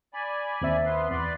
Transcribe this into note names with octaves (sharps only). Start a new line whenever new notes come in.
D5 G#5 B5
D#2 C4 E5
B3 B4 C6
E2 B4 D5 C6